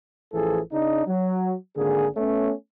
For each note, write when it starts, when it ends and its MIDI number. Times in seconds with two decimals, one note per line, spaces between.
0.33 0.60 33
0.33 0.60 52
0.33 0.60 53
0.33 0.60 68
0.33 0.60 69
0.72 1.03 49
0.72 1.03 62
0.72 1.03 63
1.07 1.54 54
1.76 2.06 32
1.76 2.06 50
1.76 2.06 58
1.76 2.06 68
2.15 2.52 57
2.15 2.52 59
2.15 2.52 61